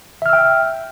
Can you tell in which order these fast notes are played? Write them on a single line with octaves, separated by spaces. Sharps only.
E5 F6 E6 G5